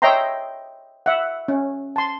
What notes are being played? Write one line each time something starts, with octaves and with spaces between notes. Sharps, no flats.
C#5 D#5 E5 G5 A#5 C6
E5 F#5
C#4
A5 C6